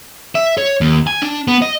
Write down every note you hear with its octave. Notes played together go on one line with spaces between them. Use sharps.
E5
C#5
D#2
G#5
D4
B3
D#5